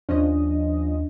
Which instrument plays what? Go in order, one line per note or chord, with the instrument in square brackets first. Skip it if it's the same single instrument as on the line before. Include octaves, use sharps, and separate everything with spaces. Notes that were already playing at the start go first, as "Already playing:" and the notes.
[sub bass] D#2 [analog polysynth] F3 C#4 D#5 [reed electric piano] D4